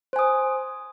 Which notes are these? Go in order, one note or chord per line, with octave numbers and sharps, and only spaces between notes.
C5 G#5 D#6